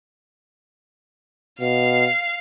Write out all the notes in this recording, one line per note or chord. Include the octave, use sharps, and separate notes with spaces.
B2 F5